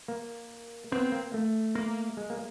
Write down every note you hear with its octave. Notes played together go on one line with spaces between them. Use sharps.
A#3
B3 C4
A#3
A3
A#3
G#3
A#3